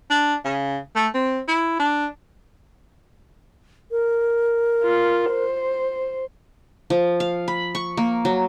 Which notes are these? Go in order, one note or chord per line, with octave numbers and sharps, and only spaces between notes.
D4
C#3
A3
C4
E4
D4
A#4
F4
C5
F3
F5
B5
C#6
A#3
F#3